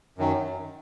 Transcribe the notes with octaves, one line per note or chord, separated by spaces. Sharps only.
F#2 D#3 F#3